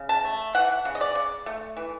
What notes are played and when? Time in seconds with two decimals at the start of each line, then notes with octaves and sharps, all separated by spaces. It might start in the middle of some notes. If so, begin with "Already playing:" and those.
Already playing: C#3
0.09 A5
0.24 A3
0.55 E3 F#5
0.85 C#3
0.95 D#5
1.01 D5
1.15 C#3
1.46 A3
1.77 E3